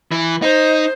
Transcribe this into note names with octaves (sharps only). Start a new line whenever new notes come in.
E3
D#4 C5